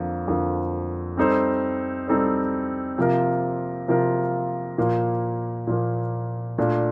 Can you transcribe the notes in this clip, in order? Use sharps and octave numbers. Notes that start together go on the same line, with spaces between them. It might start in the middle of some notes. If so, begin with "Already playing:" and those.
Already playing: F2 D3 F3 A#3
F2 D3 F3 A#3
G3 C4 D#4 A4 C5
G3 C4 D#4 A4 C5
C3 F3 A#3 F4 A#4
C3 F3 A#3 F4 A#4
A#2 F3 A#3
A#2 F3 A#3
A#2 A3 D4 F4